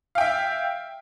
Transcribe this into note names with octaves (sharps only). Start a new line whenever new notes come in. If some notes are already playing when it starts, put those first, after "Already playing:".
E5 F5 G5